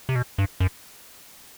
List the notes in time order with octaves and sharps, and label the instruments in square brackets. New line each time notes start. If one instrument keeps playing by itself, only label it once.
[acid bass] C3
B2
G2
F#2